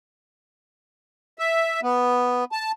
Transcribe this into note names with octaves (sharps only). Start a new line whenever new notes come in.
E5
B3
A5